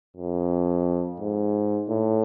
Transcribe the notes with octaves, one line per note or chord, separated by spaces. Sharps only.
F2
G#2
A2